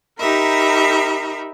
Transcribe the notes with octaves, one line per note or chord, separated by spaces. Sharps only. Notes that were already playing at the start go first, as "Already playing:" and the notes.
D#4 G4 A#4 E5 B5